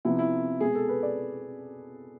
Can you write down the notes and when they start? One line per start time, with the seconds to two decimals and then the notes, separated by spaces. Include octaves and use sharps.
0.05 C3 F3 B3 E4
0.19 E4
0.60 B2 G#3 B3 G#4
0.75 A4
0.89 B4
1.03 D5